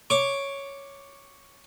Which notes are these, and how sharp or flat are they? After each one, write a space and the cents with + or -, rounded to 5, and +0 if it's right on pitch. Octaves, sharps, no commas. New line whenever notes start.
C#5 +0 D6 +0